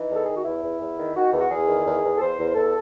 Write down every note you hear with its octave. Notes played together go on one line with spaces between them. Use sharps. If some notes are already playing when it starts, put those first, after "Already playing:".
Already playing: E3 D#4
E2
A4
D#3 G#4
F#4
E2 E4
E2
E2
D#3
D#3 F#4
E2
F#4
E2 G#4
D#3
E2
E2
A4
E2 C5
E2
E2 A4